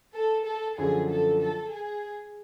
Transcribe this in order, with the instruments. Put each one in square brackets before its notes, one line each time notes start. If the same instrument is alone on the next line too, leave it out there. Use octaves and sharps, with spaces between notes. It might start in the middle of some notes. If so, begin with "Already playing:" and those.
[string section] A4
A4
[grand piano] F#2 D3 F3 [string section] G#4
[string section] A4
A4
G#4